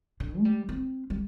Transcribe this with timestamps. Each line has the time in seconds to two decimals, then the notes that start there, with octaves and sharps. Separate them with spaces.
0.20 D3
0.39 A3
0.45 G3
0.69 C4
1.10 G3